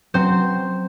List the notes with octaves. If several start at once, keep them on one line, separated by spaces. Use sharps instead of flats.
F#3 C4 C5